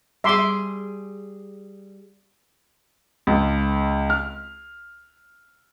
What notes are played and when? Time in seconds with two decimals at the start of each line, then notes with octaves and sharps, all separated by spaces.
0.24 G3 G#4 E5 C6 D6
3.27 C#2
4.10 F6